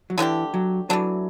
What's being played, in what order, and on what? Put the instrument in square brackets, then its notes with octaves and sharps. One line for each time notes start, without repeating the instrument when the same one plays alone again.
[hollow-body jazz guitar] F#3
[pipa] D3 A3 D4 G4 [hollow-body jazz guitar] E3
[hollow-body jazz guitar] F#3
[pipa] E3 A3 D4 [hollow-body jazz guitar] F#3